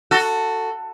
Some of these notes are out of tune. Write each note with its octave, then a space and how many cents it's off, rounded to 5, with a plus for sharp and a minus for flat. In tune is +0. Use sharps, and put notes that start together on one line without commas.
F#4 +0 A4 +15